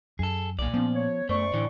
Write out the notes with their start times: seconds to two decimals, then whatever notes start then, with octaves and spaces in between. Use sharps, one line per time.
0.19 F#2 G#4 A4
0.59 B1 A#2 D5
0.74 F3 B3 C#4
0.95 C#5
1.29 F#2 A3 C5 D5 C#6
1.54 A2 D3 E3